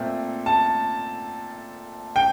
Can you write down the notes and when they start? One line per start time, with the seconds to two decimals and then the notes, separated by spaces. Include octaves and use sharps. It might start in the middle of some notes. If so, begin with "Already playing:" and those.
Already playing: A#2 A3 C4
0.46 A5
2.16 G5